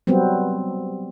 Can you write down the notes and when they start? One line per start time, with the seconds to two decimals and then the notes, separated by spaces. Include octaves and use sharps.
0.07 F#3 G3 B3 C4